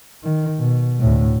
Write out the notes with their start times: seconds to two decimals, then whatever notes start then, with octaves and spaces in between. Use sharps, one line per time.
0.24 D#3
0.59 B2
0.99 D2 A2